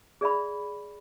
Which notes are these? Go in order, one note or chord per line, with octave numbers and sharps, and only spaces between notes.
G#4 D5 E5 B5